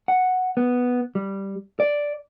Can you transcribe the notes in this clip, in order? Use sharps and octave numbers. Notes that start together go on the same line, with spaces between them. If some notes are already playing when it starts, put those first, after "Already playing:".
F#5
B3
G3
D5